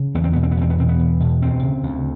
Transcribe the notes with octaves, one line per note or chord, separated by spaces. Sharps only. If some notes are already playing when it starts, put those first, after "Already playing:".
Already playing: C#3
E2 B3
C4
B2 B3
C4
B3
E2 C4
B3
B2 C4
B3
E2
B2
D2 C4
C#3
D2